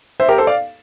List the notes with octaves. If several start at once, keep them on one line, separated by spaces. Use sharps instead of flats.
C5 E5
G4 A#4
A4 C5
D5 F5